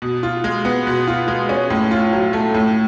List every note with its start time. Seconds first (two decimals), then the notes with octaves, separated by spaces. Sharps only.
0.02 B2
0.23 F4
0.44 G#3
0.65 B3
0.87 B2
1.08 F4
1.28 G#3
1.49 C#4
1.70 A2
1.91 F4
2.13 F#3
2.33 A3
2.54 A2